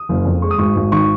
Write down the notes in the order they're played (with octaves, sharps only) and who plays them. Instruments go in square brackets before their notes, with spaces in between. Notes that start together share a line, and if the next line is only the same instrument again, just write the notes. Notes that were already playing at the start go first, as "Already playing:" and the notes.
Already playing: [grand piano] D#6
F#1
F2
G#3 C#6
D#6
G#1 C#6
G#1
D#3 C#6